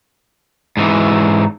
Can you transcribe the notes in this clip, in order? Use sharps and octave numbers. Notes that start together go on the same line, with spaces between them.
G#2 E3